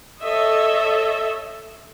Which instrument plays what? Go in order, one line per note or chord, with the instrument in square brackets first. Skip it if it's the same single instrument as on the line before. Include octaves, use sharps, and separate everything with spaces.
[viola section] A4 C#5 D#5 E5